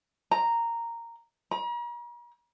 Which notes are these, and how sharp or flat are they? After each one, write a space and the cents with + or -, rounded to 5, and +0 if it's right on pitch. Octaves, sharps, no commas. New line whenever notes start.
A#5 -5
A#5 +45